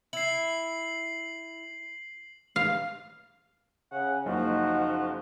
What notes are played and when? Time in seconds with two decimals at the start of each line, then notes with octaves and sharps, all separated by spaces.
0.13 E4 C7 F#7
2.56 F5
3.92 C#3 F#5
4.26 F#1 F3 D#4 F#4